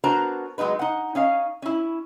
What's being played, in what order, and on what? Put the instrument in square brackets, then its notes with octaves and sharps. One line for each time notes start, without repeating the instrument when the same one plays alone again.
[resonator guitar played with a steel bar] B3 D4 F#4 A#4 C5 A#5
F#3 G#3 B3 D#4 B4
D#4 F#5
C#4 D#4 F5
C#4 E4